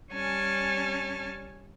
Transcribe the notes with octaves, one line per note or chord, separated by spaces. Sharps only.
G3 C#4 G#5 A5 F6